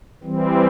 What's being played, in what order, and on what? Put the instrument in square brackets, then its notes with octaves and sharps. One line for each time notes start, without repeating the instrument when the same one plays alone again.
[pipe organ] E3 G3 C4